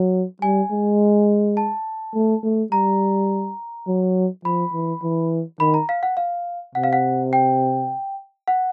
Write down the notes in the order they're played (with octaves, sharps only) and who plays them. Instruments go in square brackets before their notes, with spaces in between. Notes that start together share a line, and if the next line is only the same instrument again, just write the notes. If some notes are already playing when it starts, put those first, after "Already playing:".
Already playing: [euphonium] F#3
[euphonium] G3 [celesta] G#5
[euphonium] G#3
[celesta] A5
[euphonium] A3
A3
[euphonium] G3 [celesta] A#5
[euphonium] F#3
[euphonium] F3 [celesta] B5
[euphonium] E3
E3
[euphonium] D#3 [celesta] B5
[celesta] A#5
F5
F#5
F5
[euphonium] C3 [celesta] F#5
[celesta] F5
F#5
G5
F#5